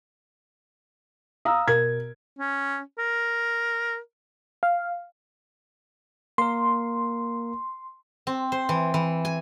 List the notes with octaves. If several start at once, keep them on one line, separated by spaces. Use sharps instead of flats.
F5 A#5 D#6 E6
B2 A#4 G#6
C#4
A#4
F5
A#3 A#4 C6
C4
C5
E3
E3
G#5